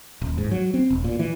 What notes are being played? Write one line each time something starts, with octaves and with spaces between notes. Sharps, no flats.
D#1
G#2
F#3
C4
E1
A#2
E3